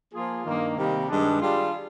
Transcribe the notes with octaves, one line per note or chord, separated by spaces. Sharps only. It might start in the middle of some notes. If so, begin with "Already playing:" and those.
F3 A#3 F4 G#4
G2 D#3 A#3
C3 D#3 G3 A#3
G2 D#3 G#3 D4
G3 D4 F4 G#4